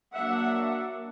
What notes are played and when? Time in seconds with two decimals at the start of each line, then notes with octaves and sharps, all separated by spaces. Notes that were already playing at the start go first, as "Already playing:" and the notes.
0.14 F#3 A#3 D4 E5 F#5